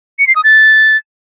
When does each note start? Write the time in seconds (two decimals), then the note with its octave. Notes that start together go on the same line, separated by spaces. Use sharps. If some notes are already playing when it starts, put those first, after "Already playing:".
0.19 C#7
0.27 C7
0.36 D#6
0.44 A6